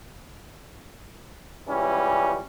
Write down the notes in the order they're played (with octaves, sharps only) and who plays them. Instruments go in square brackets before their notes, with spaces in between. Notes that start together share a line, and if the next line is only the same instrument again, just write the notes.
[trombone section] C#2 E3 G3 C#4